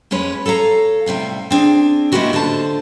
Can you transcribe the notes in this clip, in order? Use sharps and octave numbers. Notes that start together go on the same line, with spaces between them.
F2 G#3 C#4 B4
A4 C#5 F5 A#5
A2 C3 G3 F5
C4 D4 G#4
G#3 A#3 B3 E4 F#4 G4
D3 F4 C5 A5